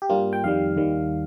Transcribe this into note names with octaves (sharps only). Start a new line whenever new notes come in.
G4
G2 G3 A#3 F4
G5
F2 D#3 G3 F5
D#2 D#3 G3